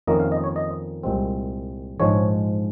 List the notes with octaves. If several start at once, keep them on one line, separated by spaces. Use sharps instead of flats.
F2 D#3 A#3 C#4 D#5
F5
D#5
C#5
D#5
C2 A#2 G#3 C4
A#1 G#2 F3 G#3 C#5